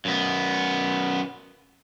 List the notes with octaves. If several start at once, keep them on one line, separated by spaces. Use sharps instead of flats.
F#2 B3